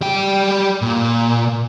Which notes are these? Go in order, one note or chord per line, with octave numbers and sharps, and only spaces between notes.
G3 G5
A#2